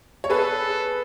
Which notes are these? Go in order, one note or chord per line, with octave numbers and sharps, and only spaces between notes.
C#5
G#4 A4 B4